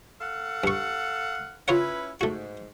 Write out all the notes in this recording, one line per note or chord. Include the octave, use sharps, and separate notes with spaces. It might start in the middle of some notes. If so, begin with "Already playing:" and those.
A4 F5 F#5
G2 C#6
C#4 E4 F4 B4 C#5 F#5
G#2 A3 F#4